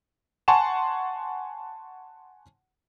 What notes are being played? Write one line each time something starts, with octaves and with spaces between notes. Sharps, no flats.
F#5 G#5 A5 C6 C#6 E7